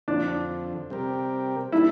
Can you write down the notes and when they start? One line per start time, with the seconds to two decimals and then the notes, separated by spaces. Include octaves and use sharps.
0.08 F2 D3 F3 D4
0.90 C3 G3 C4 G4 A#4
1.72 G3 D4 E4 A4